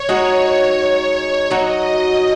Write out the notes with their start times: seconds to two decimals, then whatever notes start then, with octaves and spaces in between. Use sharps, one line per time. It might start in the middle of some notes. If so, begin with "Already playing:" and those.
Already playing: C#5
0.09 G#3 D#4 F#4
1.51 F#3 D#4 F#4 D#5